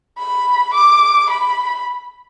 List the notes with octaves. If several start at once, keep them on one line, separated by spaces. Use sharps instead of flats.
B5
D6
B5